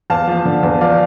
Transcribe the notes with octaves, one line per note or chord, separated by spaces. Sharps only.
E2 F5 A5
F3
D3
E2
F3 D5 F5